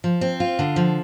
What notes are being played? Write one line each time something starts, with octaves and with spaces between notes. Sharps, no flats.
F3
C4
F4
D3
F3